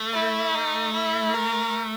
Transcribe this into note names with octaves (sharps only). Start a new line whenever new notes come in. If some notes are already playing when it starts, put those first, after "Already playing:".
Already playing: A3
E4
D#4
E4
A#4